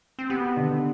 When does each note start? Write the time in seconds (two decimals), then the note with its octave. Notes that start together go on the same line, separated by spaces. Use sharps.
0.19 C4
0.30 B3 G4
0.57 D3